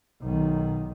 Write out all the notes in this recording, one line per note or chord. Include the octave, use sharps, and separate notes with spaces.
B1 D#3